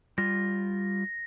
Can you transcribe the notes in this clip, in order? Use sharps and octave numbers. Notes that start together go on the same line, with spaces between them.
G3 F4 A#6